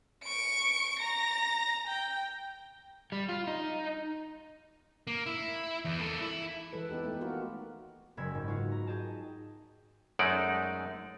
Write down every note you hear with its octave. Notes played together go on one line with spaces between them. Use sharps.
C#6 D7
A#5 A#6
G5
G3
F4
D#4
A#3
E4
E2
A#3 A4
E4
E3 G#3 A4 B4
B3 D#4 G4 A4
A3
A#3 F4 F#4 A#4
F#1 G#3 B5 E6 G#6
G#2
B3 F4 F#4
A#5
G#4 D#5 G5 A5
F#2 G#3 A3 D#4 D5